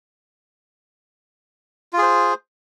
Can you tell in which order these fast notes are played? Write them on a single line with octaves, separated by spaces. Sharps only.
F4 G#4 C5